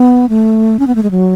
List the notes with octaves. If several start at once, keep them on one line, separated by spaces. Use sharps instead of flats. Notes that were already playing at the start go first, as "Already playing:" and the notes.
Already playing: B3
A3
C#4
B3
A3
G#3
F#3